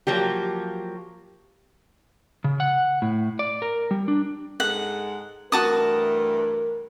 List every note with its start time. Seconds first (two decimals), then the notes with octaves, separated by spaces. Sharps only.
0.07 F3 F#3 A#3 G4
2.44 C#3
2.60 F#5
3.02 A2
3.39 D5
3.62 A#4
3.91 G3
4.08 D4
4.60 G#2 G#3 A4 F#5
5.52 G2 E3 A3 F#4 A#4 A5 D#6